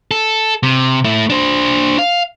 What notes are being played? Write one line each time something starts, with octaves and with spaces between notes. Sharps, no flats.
A4
C3
A3 E4
D4 C5
F5